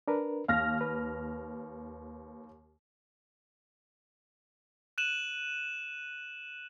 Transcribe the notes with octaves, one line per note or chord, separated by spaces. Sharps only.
D4 A#4 B4
D#2 F5 F6 A#6
B4
F#6 D#7 E7 F#7